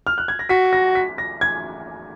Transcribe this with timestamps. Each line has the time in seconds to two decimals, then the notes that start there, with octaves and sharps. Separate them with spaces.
0.07 F6
0.18 F#6
0.28 G#6
0.39 A#6
0.49 F#4 B6
0.73 A#6
0.95 B6
1.18 A#6
1.41 G#6